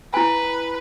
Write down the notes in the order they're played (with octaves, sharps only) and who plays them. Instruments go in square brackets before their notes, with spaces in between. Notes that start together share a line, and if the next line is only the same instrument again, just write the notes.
[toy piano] E4 G#5 [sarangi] B4